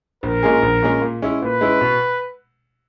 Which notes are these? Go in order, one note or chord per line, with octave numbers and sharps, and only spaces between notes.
A#1 A#4
A#2 G#3 C#4 G#4
A#1
A#2 G#3 C#4 G#4
A#2
G#3 C#4 E4
A#2 B4
G#3 C#4 E4
B2